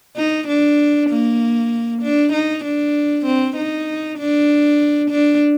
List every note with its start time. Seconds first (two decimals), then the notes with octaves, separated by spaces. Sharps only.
0.17 D#4
0.48 D4
1.10 A#3
2.03 D4
2.33 D#4
2.64 D4
3.26 C4
3.57 D#4
4.18 D4
5.11 D4